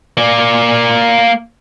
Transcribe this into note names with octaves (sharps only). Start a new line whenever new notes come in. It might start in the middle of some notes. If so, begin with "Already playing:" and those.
A#3 D5